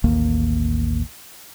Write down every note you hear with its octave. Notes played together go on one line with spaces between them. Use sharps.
A1 D#2 D#3 A#3